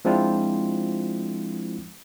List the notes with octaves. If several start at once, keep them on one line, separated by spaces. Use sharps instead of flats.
F3 G#3 C4 D4 E4 F4